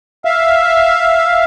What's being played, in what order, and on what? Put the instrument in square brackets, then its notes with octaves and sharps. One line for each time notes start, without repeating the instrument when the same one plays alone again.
[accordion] E5 F5